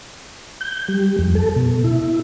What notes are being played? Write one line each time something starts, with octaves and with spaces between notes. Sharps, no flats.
G6
G3
F2
A4
B2
E4